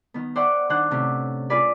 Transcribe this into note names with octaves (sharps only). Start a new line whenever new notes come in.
D#3 B3
C5 D5 E5 F#5 G5 C#6
D#3 D4 C5 F#5 F#6 G6
A2 C3 C#4
F4 G#4 B4 D5